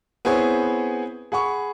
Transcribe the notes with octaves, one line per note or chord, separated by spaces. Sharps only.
B3 C4 E4 G#4 C5 C#5
G#4 F#5 B5 C#6